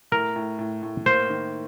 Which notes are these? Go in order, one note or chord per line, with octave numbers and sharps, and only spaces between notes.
A2 A#4
A2
A2
A2
A#3 C5
D#3